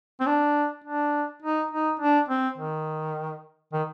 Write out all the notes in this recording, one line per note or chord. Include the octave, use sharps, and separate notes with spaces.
C4
D4
D4
D#4
D#4
D4
C4
D#3
D#3